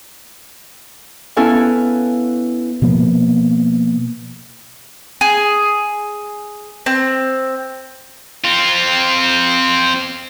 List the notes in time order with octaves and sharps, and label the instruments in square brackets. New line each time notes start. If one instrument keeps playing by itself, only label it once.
[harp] B3 C#4 E4 A4 F5 G#5
[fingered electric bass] B2 F3 A#3 B3
[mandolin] G#4
C4
[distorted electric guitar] C4 F4